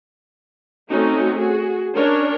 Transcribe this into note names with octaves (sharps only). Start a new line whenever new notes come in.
A3 C4 C#4 D#4 F#4
F#4 G#4
C#4 D4 A#4 C#5